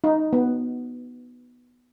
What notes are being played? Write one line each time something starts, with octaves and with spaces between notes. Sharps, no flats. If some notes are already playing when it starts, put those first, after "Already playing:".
D#4
B3